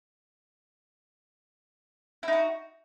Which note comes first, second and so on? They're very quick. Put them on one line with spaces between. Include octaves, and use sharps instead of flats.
E4 D#4 F#4